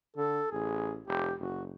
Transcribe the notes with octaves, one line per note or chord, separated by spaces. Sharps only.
D3 A4
A1 G#4
F1 G4
F#1 F#4